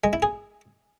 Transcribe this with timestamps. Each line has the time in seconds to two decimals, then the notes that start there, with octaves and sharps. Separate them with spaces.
0.04 G#3
0.13 E4
0.22 G#4